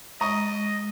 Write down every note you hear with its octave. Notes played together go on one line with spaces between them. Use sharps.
G#3 D#5 A#5 C#6 D#6